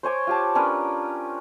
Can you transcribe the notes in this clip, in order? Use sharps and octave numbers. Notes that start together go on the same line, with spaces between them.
C5 C#5 G#5 D6
F4 G4 A5
C#4 D4 A#4 B4